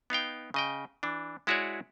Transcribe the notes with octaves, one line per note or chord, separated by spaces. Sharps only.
B3 D#4 F5 G5
C#3 D#5 G5
E3 D4
G#3 E4 F#4 G#4 C#5 D5